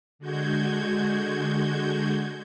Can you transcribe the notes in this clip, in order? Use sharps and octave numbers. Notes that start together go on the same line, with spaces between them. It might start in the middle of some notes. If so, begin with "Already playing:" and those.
D3 G#3 F#4 G6 G#6